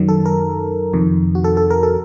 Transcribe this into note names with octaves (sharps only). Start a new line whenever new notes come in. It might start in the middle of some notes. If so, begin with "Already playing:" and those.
Already playing: F#2 D#3 F#3
A4
A#4
F2 C3 D#3
F#4
A4
A4
A#4
A4